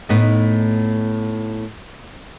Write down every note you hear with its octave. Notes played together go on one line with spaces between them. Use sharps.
A2 B3 D#4